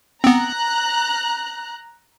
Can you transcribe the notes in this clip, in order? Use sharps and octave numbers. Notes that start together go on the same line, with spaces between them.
B3 C4 A#5 F#6